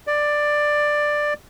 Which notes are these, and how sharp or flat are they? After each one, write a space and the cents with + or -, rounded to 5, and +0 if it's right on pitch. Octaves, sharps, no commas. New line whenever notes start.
D5 +10